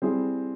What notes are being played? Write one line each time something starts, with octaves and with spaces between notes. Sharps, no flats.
G3 C4 E4 G#4